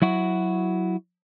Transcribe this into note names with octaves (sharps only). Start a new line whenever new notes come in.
F#3 E4 F#4